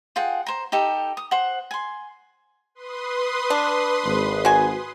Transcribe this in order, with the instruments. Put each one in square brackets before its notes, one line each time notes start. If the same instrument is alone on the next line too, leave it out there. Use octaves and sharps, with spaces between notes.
[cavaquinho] F4 G#4 F#5 G5
C5 A#5
D#4 G4 A4
D#6
C5 F#5
G#5 C6
[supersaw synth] B4 C6 D#6
[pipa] D4
[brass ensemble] G#1
[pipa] F#4 G#5